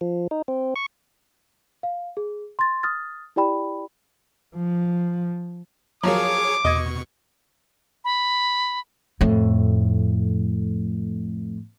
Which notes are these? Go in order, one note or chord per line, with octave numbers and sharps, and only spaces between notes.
F3
D#4
C4
C#6
F5
G#4
C6 A6
D#6 F6 A6
E4 G4 D5 G5 B5
F3
F3 F#3 A#3 G#4 C#5 A#5 D6
E2 B2 D#5 C#6 G#6
B5
F2 A2